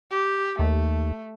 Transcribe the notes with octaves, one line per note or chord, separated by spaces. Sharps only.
G4
D#2 A3